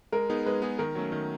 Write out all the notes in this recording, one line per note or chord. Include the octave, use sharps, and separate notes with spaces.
G#3 A#4
B3 D#4 G#4
G#3 B4
B3 D#4 G#4
D#3 A#4
F#3 A3 C#4
D#3